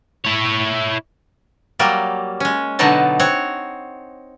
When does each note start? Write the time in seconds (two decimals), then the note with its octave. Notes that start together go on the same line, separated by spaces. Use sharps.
0.25 E4 C#5
1.79 F#3 G3 A#3 D5
2.40 G#3 C#4
2.79 B2 D3 F#3 B3 D#4 A5
3.19 C4 C#5 F#5